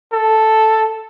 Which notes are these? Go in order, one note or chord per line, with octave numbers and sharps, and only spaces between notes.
A4